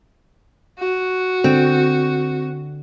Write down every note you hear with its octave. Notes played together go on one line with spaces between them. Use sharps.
F#4
D3 C4